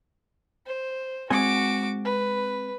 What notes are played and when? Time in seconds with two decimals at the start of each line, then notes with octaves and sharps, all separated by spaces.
0.66 C5
1.30 G#3 C4 F#4 G#5 D6
2.05 B4